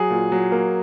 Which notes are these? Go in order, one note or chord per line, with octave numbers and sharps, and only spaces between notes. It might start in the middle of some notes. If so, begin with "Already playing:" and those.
Already playing: F#3 G#4
A#2
F#3
A#3